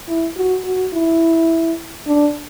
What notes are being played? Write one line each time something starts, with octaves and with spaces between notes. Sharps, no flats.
E4
F#4
F#4
E4
D4